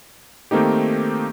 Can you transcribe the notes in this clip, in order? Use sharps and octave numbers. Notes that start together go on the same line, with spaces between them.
D#3 A3 A#3 C4 D#4 G4